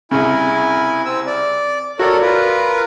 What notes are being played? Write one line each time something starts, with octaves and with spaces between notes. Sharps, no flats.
C2 C#3 E4 G#5
C4 E6
D5
F#4 A4 A#4 C#5 D5
F4 A#4 B4